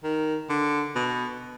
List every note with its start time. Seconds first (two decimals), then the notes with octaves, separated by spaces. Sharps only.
0.03 D#3
0.49 D3
0.95 B2